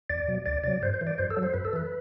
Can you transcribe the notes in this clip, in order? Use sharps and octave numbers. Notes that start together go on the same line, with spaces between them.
E2 D5
B2 F#3
D2 D5
C3 F#3 D5
G2 C5
C5
E3
D5
F#2 C5
A4
F#3
C5
F#2 B4
A4
E3 B4